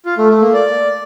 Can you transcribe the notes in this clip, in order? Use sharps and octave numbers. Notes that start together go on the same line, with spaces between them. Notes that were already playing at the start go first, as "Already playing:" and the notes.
F4
A3
A3
A#3
D5